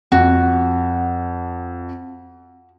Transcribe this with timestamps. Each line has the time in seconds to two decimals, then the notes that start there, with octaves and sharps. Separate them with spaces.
0.12 F2 F#4